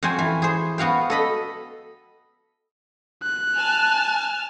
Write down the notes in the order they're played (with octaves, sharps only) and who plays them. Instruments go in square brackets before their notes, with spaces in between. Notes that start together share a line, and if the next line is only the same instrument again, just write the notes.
[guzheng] F2 F#4 C5 G5 G#5
E3
G#4 C5
B3 F#4 F5 G5
A4 D#5 B5
[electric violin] F#6
[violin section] G#5 A5 F6